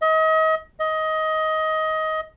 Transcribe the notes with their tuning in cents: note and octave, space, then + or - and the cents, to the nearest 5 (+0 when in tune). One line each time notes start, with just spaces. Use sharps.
D#5 +35
D#5 +20